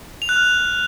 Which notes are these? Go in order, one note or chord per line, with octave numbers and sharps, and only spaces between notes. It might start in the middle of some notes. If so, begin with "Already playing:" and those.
F7
F#6
F6